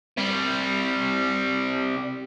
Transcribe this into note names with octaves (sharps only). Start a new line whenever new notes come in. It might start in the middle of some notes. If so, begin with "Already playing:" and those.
C3 G3